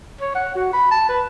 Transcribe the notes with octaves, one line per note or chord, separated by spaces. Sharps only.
C#5
F#5
F#4
B5
A5
B4